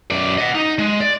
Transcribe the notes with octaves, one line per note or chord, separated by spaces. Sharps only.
F#2 D5
D#5 F#5
D#4
G#3
D5